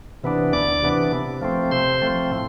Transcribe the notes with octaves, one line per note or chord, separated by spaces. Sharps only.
C3 E3 B3 D4
D2 D5 D6
C3 E3 B3 D4
C3
F3 A3 C4
C3 C5 C6
F3 A3 C4
A2